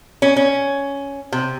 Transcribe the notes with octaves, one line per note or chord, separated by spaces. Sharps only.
C#4
C#4
C3